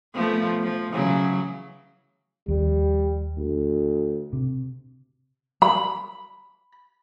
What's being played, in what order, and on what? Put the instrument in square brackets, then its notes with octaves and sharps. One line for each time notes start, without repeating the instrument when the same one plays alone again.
[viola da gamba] F3 A3 B3
F3
C#3 E3 F#3
[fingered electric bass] D#2 F3 [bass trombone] G3
[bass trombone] D2
[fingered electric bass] C3
[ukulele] B5